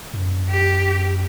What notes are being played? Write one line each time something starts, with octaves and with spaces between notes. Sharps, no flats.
F#2
G4